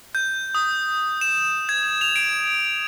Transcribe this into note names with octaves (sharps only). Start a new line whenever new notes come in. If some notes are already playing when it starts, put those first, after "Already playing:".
G6
D#6
E7
G#6
F7
D7